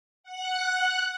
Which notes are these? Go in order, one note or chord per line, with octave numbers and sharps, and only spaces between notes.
F#5 F#6